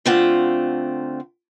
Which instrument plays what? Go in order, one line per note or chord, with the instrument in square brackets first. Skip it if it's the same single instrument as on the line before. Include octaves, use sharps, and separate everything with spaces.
[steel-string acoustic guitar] D3 A3 C4 F4 F#5